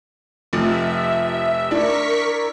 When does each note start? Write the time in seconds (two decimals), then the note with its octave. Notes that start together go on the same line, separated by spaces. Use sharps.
0.53 F1 C3 F3 E5
1.71 D4 E4 A#4 C#6 B6